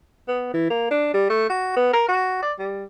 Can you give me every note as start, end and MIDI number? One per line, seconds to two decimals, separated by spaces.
0.28 0.51 59
0.54 0.69 52
0.70 0.88 58
0.91 1.10 62
1.14 1.26 55
1.30 1.48 57
1.50 1.76 66
1.76 1.90 59
1.93 2.05 70
2.08 2.38 66
2.42 2.53 74
2.59 2.85 55